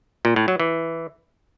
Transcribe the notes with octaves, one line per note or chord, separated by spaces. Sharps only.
A#2
A2
F#3
E3